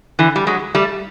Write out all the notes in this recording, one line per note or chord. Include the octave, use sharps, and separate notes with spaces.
D3 E3
G3
F#3 G#3
G3 A3